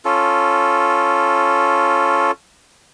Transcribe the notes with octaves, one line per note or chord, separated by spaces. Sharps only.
C#4 F4 A4